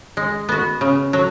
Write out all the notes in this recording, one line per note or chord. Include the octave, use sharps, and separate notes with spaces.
G#3
B3 F#4
C#3
F#3